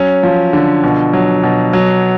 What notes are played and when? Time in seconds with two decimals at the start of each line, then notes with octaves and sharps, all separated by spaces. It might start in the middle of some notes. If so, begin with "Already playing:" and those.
Already playing: F#3 C#4
0.23 F3
0.53 D3
0.84 B2
1.13 F#3
1.43 B2
1.73 F#3